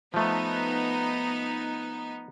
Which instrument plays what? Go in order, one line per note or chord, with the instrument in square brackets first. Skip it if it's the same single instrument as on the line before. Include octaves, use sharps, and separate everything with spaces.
[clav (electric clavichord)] F3 A3 [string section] B3 D#4